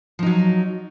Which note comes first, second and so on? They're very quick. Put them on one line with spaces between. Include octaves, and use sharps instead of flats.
F3 D#4 F#3